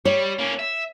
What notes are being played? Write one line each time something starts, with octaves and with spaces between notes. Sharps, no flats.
G3 C#5
A#3 C#4
E5